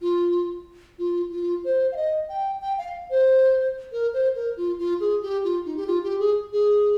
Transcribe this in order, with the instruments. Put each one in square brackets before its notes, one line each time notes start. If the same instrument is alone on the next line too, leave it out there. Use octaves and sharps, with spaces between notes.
[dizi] F4
F4
F4
C5
F5
D#5
G5
G5
F5
C5
A#4
C5
A#4
F4
F4
G#4
G4
F4
D#4
G4
F4
G4
G#4
G#4